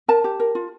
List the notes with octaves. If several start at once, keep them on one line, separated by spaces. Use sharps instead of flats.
A#4 A5
G4
A#4
F4